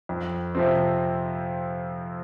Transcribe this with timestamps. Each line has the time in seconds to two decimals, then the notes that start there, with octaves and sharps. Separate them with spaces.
0.09 F2
0.55 C3 F3 C4